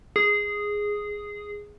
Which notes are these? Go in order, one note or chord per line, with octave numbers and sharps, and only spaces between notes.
G#4